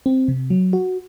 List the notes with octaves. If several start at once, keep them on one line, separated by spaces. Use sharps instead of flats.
C4
C3
F#3
F#4